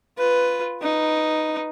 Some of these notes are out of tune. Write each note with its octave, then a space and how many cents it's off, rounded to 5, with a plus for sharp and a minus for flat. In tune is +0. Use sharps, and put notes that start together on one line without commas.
F4 +0 B4 +5
D#4 +0 B4 +0